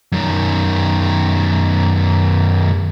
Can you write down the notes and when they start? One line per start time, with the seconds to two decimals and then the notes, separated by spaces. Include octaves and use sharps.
0.12 F#2 D#3